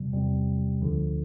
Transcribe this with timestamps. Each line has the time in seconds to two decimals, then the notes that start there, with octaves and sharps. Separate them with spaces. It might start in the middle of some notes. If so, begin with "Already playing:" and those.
Already playing: E2 C3 G3
0.13 E2 C3 G3
0.82 D2 D3 F3